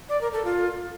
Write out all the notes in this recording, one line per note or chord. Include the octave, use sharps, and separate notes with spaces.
D5
A#4
A4
F4